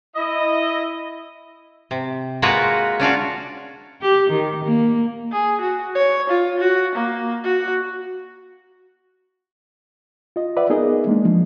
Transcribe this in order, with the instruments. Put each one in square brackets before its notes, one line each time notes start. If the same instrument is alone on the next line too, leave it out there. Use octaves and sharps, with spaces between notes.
[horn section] E4 D#5
[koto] C3
G#3 A#3 F4 F#4 A#4 B4
C#4 D4 F4 F#4
[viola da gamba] G4
D#3
A#3
[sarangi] G#4
F#4
C#5
F4
F#4
A#3
F#4
[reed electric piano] F4 D#5
B4 D5 E5 F#5
B3 D#4 G#4 A#4 D#5
G#3 A#3 D4
F3